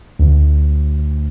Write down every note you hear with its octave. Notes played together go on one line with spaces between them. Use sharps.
D2